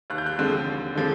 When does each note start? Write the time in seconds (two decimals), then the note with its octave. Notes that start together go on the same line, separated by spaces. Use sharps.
0.10 D#2 F#6
0.18 G6
0.26 F#6
0.39 D3 F3 G#3 C4
0.67 D#2
0.95 D3 F3 G#3 C4